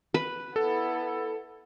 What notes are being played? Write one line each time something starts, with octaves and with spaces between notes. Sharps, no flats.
B4
B3 E4 A4